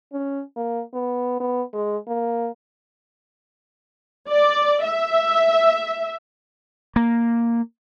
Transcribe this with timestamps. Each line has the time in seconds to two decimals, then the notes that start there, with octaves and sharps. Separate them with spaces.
0.13 C#4
0.57 A#3
0.93 B3
1.40 B3
1.73 G#3
2.07 A#3
4.29 D5
4.84 E5
6.96 A#3